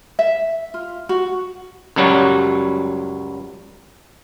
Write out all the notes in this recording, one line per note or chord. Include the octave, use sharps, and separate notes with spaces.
E5
F4
F#4
C#2 F#2 F#3 G3 C#5 F#5